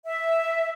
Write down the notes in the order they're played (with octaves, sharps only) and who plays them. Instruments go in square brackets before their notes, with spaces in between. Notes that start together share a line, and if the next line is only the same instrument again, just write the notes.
[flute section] E5